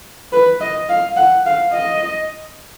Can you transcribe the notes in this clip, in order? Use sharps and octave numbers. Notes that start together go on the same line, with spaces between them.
B4
D#5
F5
F#5
F5
D#5